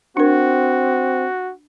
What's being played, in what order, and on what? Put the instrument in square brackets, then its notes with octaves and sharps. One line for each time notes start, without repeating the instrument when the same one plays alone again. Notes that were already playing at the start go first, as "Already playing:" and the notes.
[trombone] C4 [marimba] D4 A#4 [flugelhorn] F#4